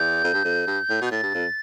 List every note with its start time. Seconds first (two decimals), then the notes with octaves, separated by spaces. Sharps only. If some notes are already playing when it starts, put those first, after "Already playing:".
Already playing: E2 G6
0.24 F2
0.34 G2
0.45 F2
0.67 G2
0.90 A2
1.01 B2 G6
1.11 A2 A6
1.23 G2
1.34 F2